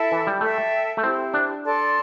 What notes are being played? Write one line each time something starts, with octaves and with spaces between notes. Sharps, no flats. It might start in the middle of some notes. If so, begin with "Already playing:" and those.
Already playing: E4 A4 E5 A5
E3
G3
A3 A4 E5 G5
A3
C4 E4 G4 C5
D4
A4 D5 A5 C6